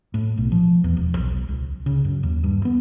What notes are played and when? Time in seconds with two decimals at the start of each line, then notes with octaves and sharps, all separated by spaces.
0.14 A2
0.37 B1
0.52 F3
0.84 E2
0.97 E1
1.17 B1
1.49 C#2
1.86 C#3
2.05 F#2
2.23 D#2
2.44 G2
2.65 B3